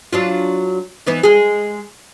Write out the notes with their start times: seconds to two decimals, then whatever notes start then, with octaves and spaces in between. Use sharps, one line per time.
0.13 F#3 D4 F4
1.07 E3 B3 D#4
1.23 G#3 G#4